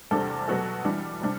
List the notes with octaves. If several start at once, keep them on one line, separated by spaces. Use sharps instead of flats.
E2 C3 G3 D4 A4
B2 F#3 B3 F#4 A4
E3 G3 D4
C3 G3 D4